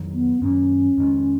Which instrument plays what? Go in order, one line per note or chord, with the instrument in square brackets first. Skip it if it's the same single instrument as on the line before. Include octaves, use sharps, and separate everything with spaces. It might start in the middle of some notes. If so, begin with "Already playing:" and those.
Already playing: [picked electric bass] F2 D#3 F#3
[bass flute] B3
[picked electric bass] F#2 D#3 F#3 A#3 [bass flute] C#4
[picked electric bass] F2 D#3 G#3